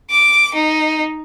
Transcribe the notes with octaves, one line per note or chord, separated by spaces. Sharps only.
D6
D#4